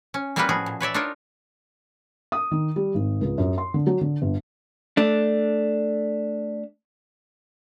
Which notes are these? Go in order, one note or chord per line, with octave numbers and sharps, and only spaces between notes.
C#4
G3 A#3 B3 F4 F#4 B4
A2 F3 F#4 G#4
A#2
B4 C#5 D5 E5
D4 D#4 F4 A#4 C#5
D#6
D#3
G3
G#1
C#2
F#2
C6
D3
F#3
D3
G1
A3 D4